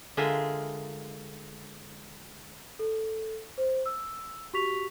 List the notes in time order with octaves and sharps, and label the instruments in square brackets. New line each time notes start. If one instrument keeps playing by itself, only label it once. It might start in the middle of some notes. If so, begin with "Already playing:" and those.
[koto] D3 G#3 F4 G#4 A#4 E5
[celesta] A4
C5
E6
F#4 G4 C#6 B6 F7